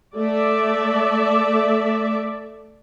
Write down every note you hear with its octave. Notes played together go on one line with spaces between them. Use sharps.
A3 D5 E5